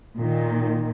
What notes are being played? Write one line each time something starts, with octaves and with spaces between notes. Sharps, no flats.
A#2 D#3